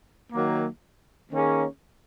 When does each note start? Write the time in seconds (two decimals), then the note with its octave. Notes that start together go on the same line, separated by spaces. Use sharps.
0.32 D#3 F#3 A#3
1.31 D#3 A#3 C#4 G#4